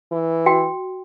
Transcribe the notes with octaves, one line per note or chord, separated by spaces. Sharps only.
E3
F#4 G5